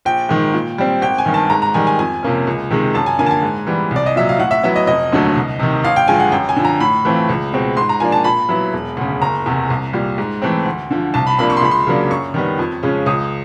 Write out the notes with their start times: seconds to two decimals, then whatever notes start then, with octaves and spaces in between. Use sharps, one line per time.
0.05 A#1 G5
0.29 G#2 D#3
0.54 A#2
0.78 G3 C4
1.02 G#1 G5
1.18 G#5
1.26 G2 D#3
1.34 A5
1.50 G#2 A#5
1.62 A#5
1.74 D#3 G3 G#5
1.87 G#5
1.99 F2 G#5
2.23 C3 F3 A#3 C#4
2.47 C#2
2.70 C3 D#3 G#3
2.94 F#2 A5
3.06 G#5
3.19 D3 F3 A#3 G#5
3.26 A5
3.31 G#5
3.43 G#2
3.67 E3 G3 B3
3.91 C2
3.96 D5
4.06 D#5
4.16 A#2 F#3 E5
4.29 F5
4.39 A2 F#5
4.51 E5
4.63 F#3 B3 E4 E5
4.76 D#5
4.87 F1 D#5
5.12 D#2 D3 F#3 A3
5.36 C2
5.59 C3 D#3
5.84 A1 F5
5.96 G5
6.08 G2 D3 F3 G#3 G#5
6.20 F#5
6.32 F#2 G5
6.49 G#5
6.56 D3 F3
6.65 A#5
6.80 A2 B5
7.05 E3 A3 C4 F4
7.29 C#2
7.53 B2 G#3 C4
7.77 G#2 C6
7.89 A#5
8.00 F3 A#3 D4 G#5
8.12 A5
8.24 A#2 B5
8.49 F#3 B3 E4
8.73 E1
8.97 D2 C#3
9.22 F#1 A#5
9.46 E2 C3
9.70 C2
9.93 A#2 G3
10.18 G#2
10.42 E3 A3 C4
10.65 D2
10.91 D3 F3
11.14 C2 A5
11.27 B5
11.38 C3 F3 A#3 D4 B5
11.50 C#6
11.57 C6
11.62 C#2 B5
11.71 C6
11.87 C#3 F#3 A#3 D4
12.10 F#2 C#6
12.34 D#3 G3 B3
12.59 F2
12.83 C#3 F3 G#3 C#4
13.06 C#2 D#6